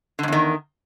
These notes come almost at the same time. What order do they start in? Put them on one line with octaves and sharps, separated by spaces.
D3 G#2 E2 D#3